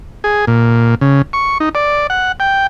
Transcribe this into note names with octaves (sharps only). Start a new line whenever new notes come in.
G#4
A#2
C#3
C#6
D#4
D5
F#5
G5